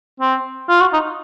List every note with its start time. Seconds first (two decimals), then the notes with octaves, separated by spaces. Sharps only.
0.20 C4
0.69 F4
0.80 F#4
0.93 D#4